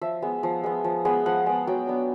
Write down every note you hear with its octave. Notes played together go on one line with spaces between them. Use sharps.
F3 E5
G#3 B3
F3
G#3 B3
F3
G#3 B3
F3 F#5
G#3 B3
F#3 G5
B3 D4